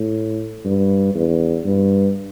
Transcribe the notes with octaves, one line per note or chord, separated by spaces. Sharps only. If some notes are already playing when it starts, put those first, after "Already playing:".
Already playing: A2
G2
E2
G2